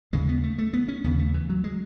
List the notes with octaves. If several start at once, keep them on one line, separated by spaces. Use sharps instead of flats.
D#2 C#3 G#3
B3
A3
A3
B3
C#4
D#2 C#3 B3
A3
E3
F#3
G#3